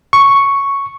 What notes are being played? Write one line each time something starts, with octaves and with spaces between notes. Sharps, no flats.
C#6